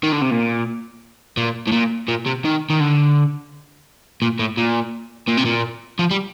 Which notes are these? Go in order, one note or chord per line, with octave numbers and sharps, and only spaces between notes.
D#3
D3
C3
A#2
A#2
A2
A#2
A#2
C3
D#3
D#3
D3
A#2
A2
A#2
A#2
C3
A#2
F3
G3